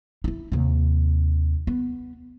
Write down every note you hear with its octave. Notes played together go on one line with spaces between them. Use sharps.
D#4 E4
D#2 C3
B3